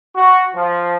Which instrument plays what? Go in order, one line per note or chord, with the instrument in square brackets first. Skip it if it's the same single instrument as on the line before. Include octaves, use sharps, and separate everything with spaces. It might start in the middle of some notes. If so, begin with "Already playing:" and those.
[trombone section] F#4
F3